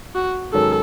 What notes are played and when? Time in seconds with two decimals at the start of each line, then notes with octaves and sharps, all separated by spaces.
0.15 F#4
0.53 G#2 D#3 F#3 C#4 G#4 A4